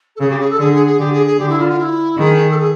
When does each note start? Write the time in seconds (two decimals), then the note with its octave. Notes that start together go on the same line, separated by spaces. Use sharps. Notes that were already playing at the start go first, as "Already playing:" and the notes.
0.16 A4
0.20 C#3 G#4
0.30 G4
0.40 G#4
0.50 A4
0.59 D3 G#4
0.73 G#4
0.86 G#4
0.99 D3 G4
1.12 G#4
1.26 G#4
1.39 D3 G4
1.49 E4
1.58 F4
1.68 F4
1.79 E4
2.18 D#3 G#4
2.50 A4
2.58 G#4